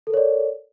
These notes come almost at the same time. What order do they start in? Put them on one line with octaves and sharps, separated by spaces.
A4 A#4 C#5 D5